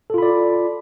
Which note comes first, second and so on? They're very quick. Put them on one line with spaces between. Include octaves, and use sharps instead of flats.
A4 F4 B5 D5